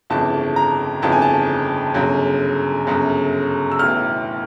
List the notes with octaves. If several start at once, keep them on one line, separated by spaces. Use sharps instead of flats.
G1 F2 C#3 E3 A5
A#5
G1 F2 C#3 E3 A5
G#5
A5
G1 F#2 C#3
G1 F#2 C#3
E6
B1 A2 E3 F6